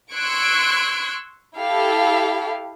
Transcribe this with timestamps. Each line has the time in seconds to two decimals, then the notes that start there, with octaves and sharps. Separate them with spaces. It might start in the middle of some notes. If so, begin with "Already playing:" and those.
0.12 C6 C#6 E6 F#6 G#6 D7
1.59 E4 G4 A4 F5